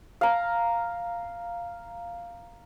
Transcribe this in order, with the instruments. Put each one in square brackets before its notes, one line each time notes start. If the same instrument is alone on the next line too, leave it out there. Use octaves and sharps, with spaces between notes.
[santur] F5 A#5